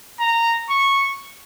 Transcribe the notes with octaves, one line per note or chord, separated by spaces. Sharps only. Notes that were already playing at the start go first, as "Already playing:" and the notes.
A#5
C#6